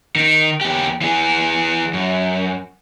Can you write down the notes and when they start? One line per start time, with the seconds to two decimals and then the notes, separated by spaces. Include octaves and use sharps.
0.16 D#3
0.61 E2 G4
1.02 E3 G#4
1.93 F#2